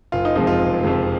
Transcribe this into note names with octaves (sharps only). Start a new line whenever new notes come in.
F#1 F4
D#4
F2 C3 F3 G#3 D#4
F4
F#1
F2 C3 F3 G#3